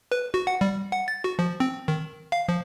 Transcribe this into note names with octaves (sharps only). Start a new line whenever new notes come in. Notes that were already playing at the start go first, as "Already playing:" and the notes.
B4
F#4
F#5
G3
F#5
A6
F#4
F3
C4
D#3
F5
F3